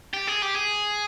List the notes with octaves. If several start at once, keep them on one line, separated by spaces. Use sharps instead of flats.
G4
G#4
G4
G#4